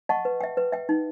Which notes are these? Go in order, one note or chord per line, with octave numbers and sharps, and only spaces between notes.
D#5 F#5 A5 C#6
B4
E5 G5
B4
E5 G5
D#4